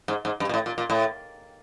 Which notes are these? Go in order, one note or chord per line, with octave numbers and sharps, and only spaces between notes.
G#2
G#2
G2
A#2
A2
A#2
A#2
A2